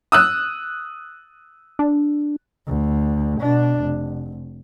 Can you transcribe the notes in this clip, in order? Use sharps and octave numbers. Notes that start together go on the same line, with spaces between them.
D#6 E6 F#6
D4
D2
B2 D4
F1